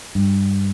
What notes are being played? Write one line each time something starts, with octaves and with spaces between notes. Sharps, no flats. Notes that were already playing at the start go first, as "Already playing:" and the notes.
G2